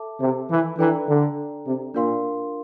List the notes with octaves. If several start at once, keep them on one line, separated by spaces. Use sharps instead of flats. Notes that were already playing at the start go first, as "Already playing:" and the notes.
Already playing: A4 E5 A5 D6
C3
E3
E3 D4 A4 D5 G5 A#5
D3
C3
A#2 D4 F4 A#4 F5 C6